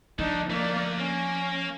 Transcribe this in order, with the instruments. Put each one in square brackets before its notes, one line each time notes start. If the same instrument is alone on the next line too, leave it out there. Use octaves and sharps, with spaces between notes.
[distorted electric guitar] D3 A3 [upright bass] F3 [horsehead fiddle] D4 D#4
[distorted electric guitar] D3 A3 [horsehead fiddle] A#3 D5
[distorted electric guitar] A#3 [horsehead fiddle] C#4